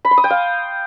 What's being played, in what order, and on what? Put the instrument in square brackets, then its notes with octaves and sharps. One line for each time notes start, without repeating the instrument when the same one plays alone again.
[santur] B5
C6
D#6
G5
F5